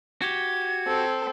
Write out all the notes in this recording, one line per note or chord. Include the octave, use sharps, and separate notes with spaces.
F#4 G4 G#6
C4 A4